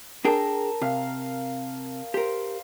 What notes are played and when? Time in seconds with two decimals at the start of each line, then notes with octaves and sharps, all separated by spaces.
0.25 D4 G#4 A#4 G5 A5 E6
0.82 C3 F5
2.14 G4 A#4 C5